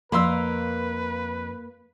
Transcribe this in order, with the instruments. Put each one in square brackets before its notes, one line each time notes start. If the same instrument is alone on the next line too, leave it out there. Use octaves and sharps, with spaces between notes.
[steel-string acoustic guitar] F2 A#4 [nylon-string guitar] A#3 [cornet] B4 [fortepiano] B5 C6 E6